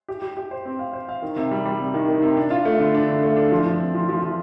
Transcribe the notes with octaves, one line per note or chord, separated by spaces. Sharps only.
G4
G4
G4
C5
C4
F5
C5
F5
D#3
C3
G3
G3
C3
D#3
D#3
C3
D4
F4
A3
D3
D4
D3
A3
D4
F3
F3
C4
F3
F3
F3